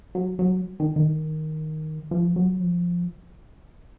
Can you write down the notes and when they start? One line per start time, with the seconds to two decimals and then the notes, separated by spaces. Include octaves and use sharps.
0.15 F#3
0.39 F#3
0.80 D#3
0.96 D#3
2.11 F3
2.36 F#3
2.60 F3